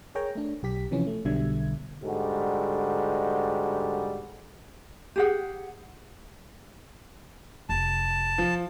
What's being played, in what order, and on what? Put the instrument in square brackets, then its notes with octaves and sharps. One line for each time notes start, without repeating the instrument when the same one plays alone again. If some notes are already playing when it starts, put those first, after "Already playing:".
[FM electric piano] G#4 A#4 C#5 G5 A#5
A3 D4
B1 G4 B6
C3 E3 F3 C#4
A3
B1 B2 D3 G3 E5 G#6
[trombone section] G#2 D3 G3 F#4
[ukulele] G4 G#4 F#5
[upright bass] F1 [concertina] A5
[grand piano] F3